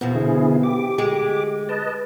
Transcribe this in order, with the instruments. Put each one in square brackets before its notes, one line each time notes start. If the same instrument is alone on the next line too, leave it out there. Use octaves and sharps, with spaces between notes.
[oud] E2 B2 F3 [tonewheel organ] B3
[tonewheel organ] D3 E4 G#4
G4 D6
[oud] D2 G#3 G#4
[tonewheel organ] B4 D#5 A5